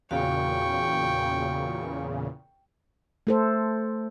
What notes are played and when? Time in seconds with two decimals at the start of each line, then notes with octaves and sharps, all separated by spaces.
0.11 E2 A#2 C#3 F#4 F5 G5 C#6
3.27 A3 A4 C5